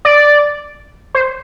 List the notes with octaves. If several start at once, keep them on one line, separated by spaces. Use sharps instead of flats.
D5
C5